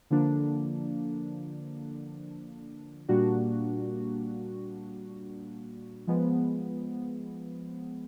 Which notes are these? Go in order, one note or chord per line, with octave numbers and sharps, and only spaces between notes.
D3 F3 A#3 D4
A#2 G3 A#3 D4 F#4
F3 G#3 B3